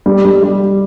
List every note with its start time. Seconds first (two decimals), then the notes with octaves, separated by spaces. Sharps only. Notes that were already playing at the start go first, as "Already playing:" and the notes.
0.06 G3
0.25 G3
0.43 G3